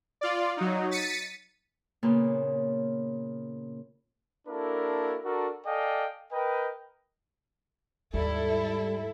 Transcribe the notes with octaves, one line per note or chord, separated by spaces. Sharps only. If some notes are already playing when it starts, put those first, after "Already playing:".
F4 D5
F#3 D#4
A6 B6 C#7 D#7
A#2 C#3 A#3 B3
A#3 D4 E4 F#4 A4 A#4
D4 F#4 A4 A#4
A4 D5 D#5 F5 G5 G#5
A#4 B4 D#5 G5
D#2 G#2 G3 E4 A4